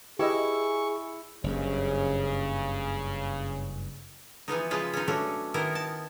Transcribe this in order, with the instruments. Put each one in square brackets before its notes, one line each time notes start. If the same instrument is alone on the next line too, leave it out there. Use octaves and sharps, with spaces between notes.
[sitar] E4 [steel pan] G4 B4 D#5 [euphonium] G#4 [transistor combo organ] C#6
[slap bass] F#1 G2 [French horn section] C#3
[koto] E3 F3 B3 D#4
C#3 F3 G#3 F4 B4
C#4 D#4
F#3 A3 C#4 D4
D#3 B3 E4 A#4
A5